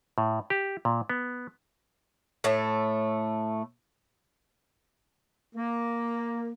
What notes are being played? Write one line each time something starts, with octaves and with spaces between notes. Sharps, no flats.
A2
G4
A#2
B3
A2 A3
A#3